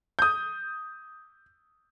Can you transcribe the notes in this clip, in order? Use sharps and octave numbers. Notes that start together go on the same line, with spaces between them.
D#6 G6